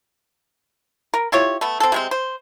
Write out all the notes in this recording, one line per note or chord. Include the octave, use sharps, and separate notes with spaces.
A#4
E4 F4 G4 C#5
A3 B3
C4 A4
C3 G#3 C4
C5